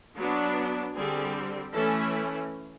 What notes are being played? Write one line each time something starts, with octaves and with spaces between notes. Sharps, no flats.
F#3 B3 D4
D3 G3 C4 G#4
E3 A3 C#4 A4